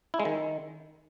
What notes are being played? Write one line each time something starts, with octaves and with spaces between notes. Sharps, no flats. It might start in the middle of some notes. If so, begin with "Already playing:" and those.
E4
G#3
D#3